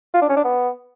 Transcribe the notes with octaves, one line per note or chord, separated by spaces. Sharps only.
F4
D4
C#4
D4
B3